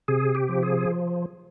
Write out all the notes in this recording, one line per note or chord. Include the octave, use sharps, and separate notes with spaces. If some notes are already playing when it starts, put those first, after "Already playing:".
C3 G#4
G4
F3
G#4